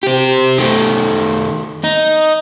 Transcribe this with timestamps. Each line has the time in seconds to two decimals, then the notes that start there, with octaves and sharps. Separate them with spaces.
0.03 G4 C5
0.58 D#3 A3
1.84 D#4